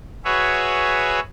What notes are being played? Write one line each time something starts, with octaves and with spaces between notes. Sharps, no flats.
F#4 G#4 B4 C#5 E5